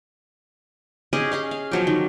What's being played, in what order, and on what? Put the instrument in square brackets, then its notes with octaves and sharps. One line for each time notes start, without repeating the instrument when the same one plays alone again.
[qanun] C#4 G4 G#4 D#5
G#4 D#5 F5
F5
F3 F#3 G4
D#3